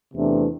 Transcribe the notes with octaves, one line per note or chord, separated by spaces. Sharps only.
E2 C3 E3 A3 D4